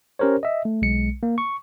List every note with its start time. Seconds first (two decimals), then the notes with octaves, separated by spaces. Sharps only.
0.19 C#4 G4 A#4 C5 C#5
0.43 D#5 E5
0.65 A3
0.82 B1 G#3 C#7
1.23 A#3
1.38 C#6